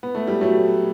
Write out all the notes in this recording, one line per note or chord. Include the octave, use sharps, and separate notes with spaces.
B3
A3
G3
F#3 A3